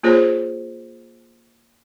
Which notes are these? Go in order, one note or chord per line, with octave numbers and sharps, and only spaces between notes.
A#3 F4 G#4 C5 C#5